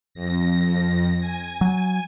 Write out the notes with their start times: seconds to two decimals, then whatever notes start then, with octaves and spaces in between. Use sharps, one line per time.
0.14 F2 A#6
1.21 G#5
1.61 F#3